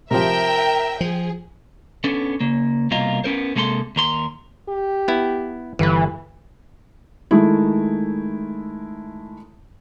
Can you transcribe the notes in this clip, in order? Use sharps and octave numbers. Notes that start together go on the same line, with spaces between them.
C3 F3 A#4 E5 G5
F3 G#4
B3 C#4 D4 A4
C#3 A#3
C2 B2 A#3 F4 A#4 D#5
B3 C#4 A#4 C5
C3 G#3 A#3 A4 A#5 C6
D#2 A#4 C6
G4
B3 E4
G1 E3 B4
D#3 G#3 A3 E4